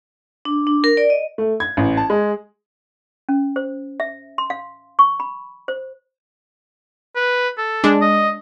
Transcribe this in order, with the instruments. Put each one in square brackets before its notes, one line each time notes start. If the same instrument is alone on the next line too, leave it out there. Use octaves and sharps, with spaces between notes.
[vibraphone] D4
D4
A#4
D5
D#5
[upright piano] A3
G#6
A1
A5
G#3
[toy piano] C#4
C5
E5
C6
F5
C#6
B5
C5
[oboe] B4
A4
[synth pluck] G#3 D4
[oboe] D#5